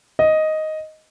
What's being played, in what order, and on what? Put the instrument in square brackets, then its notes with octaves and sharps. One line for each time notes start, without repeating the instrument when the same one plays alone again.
[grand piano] D#5